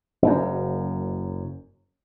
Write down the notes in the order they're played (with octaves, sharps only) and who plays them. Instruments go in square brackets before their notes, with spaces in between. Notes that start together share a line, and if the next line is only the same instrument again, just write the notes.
[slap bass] F#1 F#2